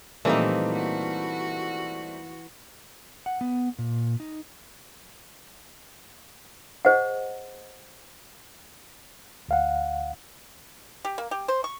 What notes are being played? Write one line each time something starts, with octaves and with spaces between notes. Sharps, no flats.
A#2 E3 F3 G3 A3 A#3 C4 D#4
F#4
F#5
B3
A#2
D#4
G#4 C5 D#5 F#5
D2 F5 F#5
G4
A#3
G4
C5
C#6